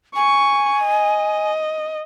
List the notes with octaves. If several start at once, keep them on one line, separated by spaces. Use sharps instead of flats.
G#5 C#6
D#5